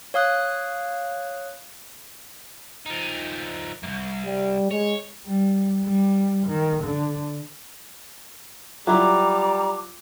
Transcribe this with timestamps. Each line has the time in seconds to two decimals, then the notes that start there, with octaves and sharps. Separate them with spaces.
0.14 C#5 F5 D#6 F#6
2.86 F3 D#4
3.83 C2 F#2
4.25 G3
4.71 G#3 C#5
5.26 G3
5.84 G3
6.47 D#3
6.83 D3
8.87 F#3 G3 E4 F4 A#5 D6